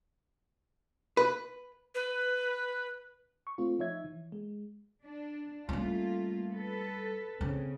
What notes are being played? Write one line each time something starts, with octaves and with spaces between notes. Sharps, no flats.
B4
B4
C#6
A3 C4 F4
F3 D#4 C#5 E5 G#6
E3
G#3
D4
G3 A3 A#3 C#4 F4
A4 B4
C#3 C4